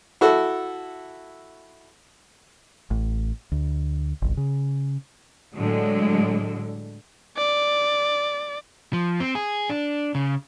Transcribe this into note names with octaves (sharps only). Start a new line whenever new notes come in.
E4 F#4 A4
A1
D2
G1 C2
C#3
A2 D3 F#3 G#3
D5
F3
C4
G#4
D4
C#3